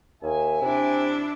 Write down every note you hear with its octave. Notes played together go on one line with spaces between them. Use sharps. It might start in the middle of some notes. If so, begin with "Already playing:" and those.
D#2 E5 G#5
C3 D4 E4